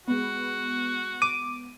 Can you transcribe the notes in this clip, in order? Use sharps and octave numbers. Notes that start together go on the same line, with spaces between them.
G#3 B3 F#4
D6 D#7